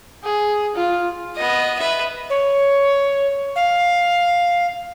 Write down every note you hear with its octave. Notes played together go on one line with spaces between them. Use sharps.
G#4
F4
B3 D#5
B4 E5
C#5
F5